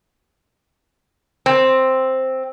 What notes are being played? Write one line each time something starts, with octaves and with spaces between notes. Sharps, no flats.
C4